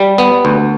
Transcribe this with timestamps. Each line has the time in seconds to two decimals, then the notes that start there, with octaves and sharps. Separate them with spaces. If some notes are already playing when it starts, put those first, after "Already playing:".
Already playing: G3
0.18 B3
0.45 D2